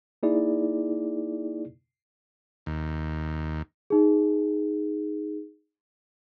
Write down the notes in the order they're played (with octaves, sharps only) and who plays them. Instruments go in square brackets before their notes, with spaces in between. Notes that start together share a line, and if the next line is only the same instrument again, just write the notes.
[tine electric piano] A#3 D#4 E4 G#4 D5
[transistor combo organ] D#2
[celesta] D#4 G#4